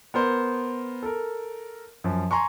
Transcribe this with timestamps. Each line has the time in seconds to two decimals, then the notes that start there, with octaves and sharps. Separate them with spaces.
0.14 B3 A#4 C5
1.03 A4 A#4
2.04 F#2 F3
2.31 G#5 A#5 C6 C#6